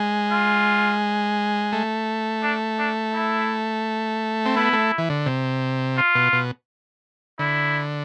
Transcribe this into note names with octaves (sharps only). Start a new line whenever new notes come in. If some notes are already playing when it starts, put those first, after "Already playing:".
Already playing: G#3
F4
A3
D4
D4
E4
C4
B3 E4
A3
E3
D3
C3
F4
B2
B2
D3 E4